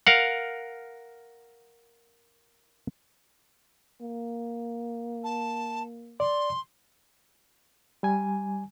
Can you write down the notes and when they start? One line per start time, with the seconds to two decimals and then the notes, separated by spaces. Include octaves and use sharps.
0.07 A#4 F5 F#5
4.01 A#3
5.24 A5
6.20 D5 C6
8.03 G3 G#5